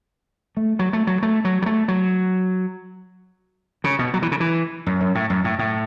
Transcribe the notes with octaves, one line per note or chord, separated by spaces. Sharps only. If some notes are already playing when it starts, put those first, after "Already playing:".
A3
F#3
A3
F#3
A3
F#3
F#3
A3
F#3
C#3
B2
F#3
E3
C#3
E3
F#2
F#2
A2
F#2
A2
A2